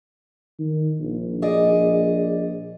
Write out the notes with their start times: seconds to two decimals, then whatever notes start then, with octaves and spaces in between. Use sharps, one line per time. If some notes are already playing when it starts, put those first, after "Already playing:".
0.59 D#3
1.00 A#1
1.42 G#4 D5 D#5